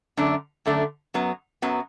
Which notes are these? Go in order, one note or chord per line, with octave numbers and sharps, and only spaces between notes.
F#2 D3 A3 D4
F#2 D3 A3 D4
F#2 F#3 B3
F#2 F#3 B3